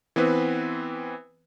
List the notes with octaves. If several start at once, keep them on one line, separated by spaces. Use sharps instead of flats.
E3 B3 C4 B4